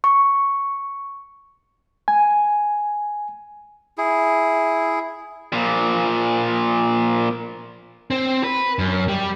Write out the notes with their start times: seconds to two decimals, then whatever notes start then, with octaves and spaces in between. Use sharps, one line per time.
0.04 C#6
2.08 G#5
3.98 E4 G#4
5.53 A#2 F3
8.10 C4
8.44 B4
8.79 F#2
9.08 G3